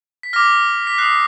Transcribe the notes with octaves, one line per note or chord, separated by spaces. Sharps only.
B6
D6 F6 A#6
B6
D#6 F#6 C7